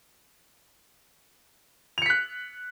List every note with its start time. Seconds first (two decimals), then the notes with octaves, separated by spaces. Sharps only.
1.98 F7
2.02 C#7
2.06 B6
2.10 F#6